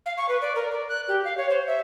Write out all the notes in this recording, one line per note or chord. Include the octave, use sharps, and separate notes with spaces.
F5
C#6
B4
D5
A#4
D5
F#6
G4
F5
C#5
C5
E5